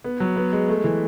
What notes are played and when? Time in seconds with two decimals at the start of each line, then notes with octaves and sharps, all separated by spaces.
0.04 B3
0.20 F#3
0.36 B3
0.52 G#3
0.69 A3
0.84 E3